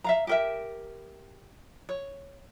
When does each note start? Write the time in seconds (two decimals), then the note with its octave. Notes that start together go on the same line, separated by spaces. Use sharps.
0.04 E5 F5 A#5
0.27 G4 A#4 E5
1.89 C#5